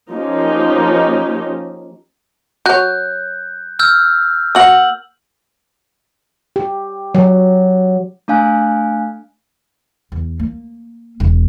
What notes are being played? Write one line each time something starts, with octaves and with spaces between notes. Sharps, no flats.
F3 A#3 C#4 D#4 G4
F#3 C#5 F#6 G6
E6 F6 G6
A#3 F#4 F#5 E6 F#7
G4
F#3
A3 D4 F5 G#5 F#6
E2
A#3
E1